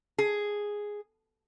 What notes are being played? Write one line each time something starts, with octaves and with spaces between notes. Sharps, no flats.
G#4